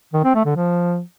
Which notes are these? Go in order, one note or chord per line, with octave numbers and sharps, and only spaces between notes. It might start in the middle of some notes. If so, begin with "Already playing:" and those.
D#3
C4
A3
D3
F3